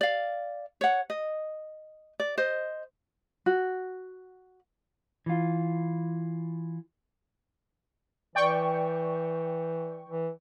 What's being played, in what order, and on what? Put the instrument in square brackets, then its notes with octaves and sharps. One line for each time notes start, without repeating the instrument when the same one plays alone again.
[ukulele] D5 F5
C#5 F#5
D#5
D5
C5 D#5
F#4
[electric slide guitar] E3 F4
[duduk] E3 [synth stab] D5 G5 C#6
[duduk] E3